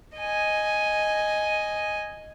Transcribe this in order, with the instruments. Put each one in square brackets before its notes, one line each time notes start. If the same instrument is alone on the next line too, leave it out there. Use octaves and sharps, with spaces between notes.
[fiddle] D#5 G#5